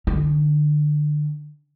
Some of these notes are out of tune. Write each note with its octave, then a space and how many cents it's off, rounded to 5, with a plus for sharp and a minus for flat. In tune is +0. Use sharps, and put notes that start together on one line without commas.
D3 +25 C#4 +0